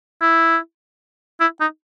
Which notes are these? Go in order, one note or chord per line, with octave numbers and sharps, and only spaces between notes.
E4
E4
D#4